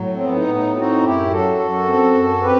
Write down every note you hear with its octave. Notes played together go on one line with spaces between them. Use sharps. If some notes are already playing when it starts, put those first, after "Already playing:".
Already playing: A2 F#3
C4
B3
D#4
A2
D#4
C4 D#4 F#4
F#2 E4 G4
F#3 F#4 A4
F#2
C4
F#2
C4 G4 B4